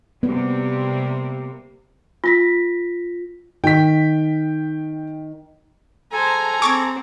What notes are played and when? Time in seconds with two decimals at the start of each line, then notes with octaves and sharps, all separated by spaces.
0.23 C3 G3 A#3 B3
2.24 F4 A#6 B6
3.64 D#3 G5 B6
6.12 F#3 G#4 A4 C5 G#5 A#5
6.62 C4 C#6 D6 G#6